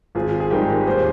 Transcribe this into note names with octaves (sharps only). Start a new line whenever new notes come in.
G#1 F4 G#4
G#4
G#2 D#3 G3 G4 A#4
D#2 G#4 C5